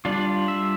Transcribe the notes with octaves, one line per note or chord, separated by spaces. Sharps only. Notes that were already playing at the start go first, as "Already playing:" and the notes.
G3 D4 F4
E5